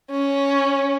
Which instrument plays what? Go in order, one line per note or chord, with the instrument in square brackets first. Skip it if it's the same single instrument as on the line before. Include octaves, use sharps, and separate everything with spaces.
[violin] C#4